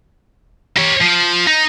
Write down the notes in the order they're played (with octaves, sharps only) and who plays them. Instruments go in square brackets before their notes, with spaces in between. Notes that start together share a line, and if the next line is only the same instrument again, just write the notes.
[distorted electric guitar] G4 C#5
F3
D#4